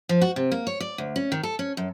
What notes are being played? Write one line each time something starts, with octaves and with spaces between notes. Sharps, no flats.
F3
F#4
C3
A#3
C#5
D5
D2
C#4
D#3
A4
C#4
F#2